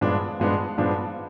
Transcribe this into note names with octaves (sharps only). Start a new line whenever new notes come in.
G2 F3 G#3 B3 D4
G2 F3 G#3 B3 D4
G2 F3 G#3 B3 D4